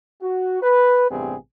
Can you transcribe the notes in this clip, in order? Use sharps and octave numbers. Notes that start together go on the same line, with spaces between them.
F#4
B4
A1 G2 C3 B3 C4 G#4